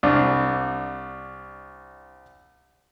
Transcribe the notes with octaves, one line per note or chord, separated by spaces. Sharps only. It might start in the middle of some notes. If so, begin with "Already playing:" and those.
C2 D4